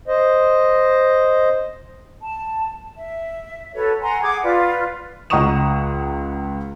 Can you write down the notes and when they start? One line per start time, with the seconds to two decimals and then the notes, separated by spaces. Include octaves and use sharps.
0.08 C5 D#5
2.22 A5
2.96 E5
3.74 F#4 A4 B4 C#5
4.02 F#5 G#5 A#5 C6
4.22 G#4 F#5 D6 G#6
4.43 F4 B4 D5
5.30 C#2 F#5 A#5 C#6 D#6 E7